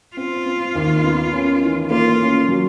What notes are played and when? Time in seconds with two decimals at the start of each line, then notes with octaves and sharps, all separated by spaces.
0.16 C4 F4
0.46 C4
0.75 D#2
1.04 B3
1.33 C#4
1.62 E3
1.91 A#3 F4
2.19 C#4
2.48 F#3